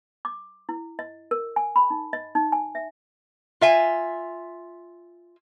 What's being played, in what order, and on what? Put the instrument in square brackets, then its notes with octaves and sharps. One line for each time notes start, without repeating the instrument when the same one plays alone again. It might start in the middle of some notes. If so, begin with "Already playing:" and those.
[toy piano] D6
E4
D#5
A#4
G#5
B5
D#4
D#5
D#4
G#5
E5
[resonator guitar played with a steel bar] F4 E5 G#5